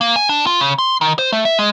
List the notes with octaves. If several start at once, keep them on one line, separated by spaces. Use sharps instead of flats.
A#3
G#5
D4
F4
C#3
C6
D#3
C5
A3
E5
G#3